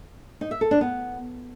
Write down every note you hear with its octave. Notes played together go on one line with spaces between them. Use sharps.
D#4
E5
A4
D4
B3